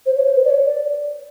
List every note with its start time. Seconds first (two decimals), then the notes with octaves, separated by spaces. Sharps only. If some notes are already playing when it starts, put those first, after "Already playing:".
0.06 C5
0.16 C#5
0.25 C5
0.36 B4
0.44 D5
0.50 C#5
0.65 D5